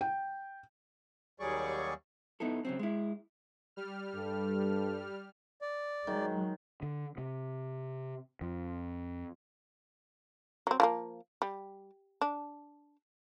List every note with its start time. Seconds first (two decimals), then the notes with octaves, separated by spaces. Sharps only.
0.01 G5
1.40 D#2 F#3 G3 G#4 D5 C#6
2.40 B3 D#4 E4 A4
2.65 C#3 F#3 C4
2.79 G#3 E4
3.76 G3 F6
4.15 G2 A4
5.62 D5
6.07 D#3 F#3 G#3
6.83 D3
7.18 C3
8.41 F2
10.67 F#3 C4
10.80 F3 G#3 A#3
11.42 G3
12.21 D4